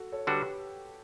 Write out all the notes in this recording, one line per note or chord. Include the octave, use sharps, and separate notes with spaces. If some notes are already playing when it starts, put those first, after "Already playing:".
Already playing: F#4 A4
A4 C#5
D3 G3 D4 F#4 G4 A4 B4